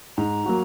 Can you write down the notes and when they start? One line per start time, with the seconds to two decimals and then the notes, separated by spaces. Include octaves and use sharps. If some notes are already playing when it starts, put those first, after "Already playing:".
0.17 G#2 A#5
0.46 F#3 A#3 F#4